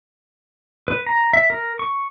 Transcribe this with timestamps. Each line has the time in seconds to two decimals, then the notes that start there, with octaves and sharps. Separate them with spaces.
0.88 B4
1.06 A#5
1.33 E5
1.50 A#4
1.79 C#6